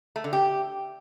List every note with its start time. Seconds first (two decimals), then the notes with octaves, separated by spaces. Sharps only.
0.16 A3
0.24 D3
0.33 G4